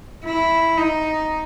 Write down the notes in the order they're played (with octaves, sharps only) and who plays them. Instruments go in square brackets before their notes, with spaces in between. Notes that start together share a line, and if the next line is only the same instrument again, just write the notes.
[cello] E4
D#4